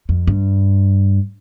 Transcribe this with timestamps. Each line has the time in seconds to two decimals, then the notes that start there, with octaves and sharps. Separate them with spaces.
0.09 F2
0.27 G2